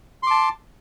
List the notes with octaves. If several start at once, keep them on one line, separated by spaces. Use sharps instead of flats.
A5 C6 D6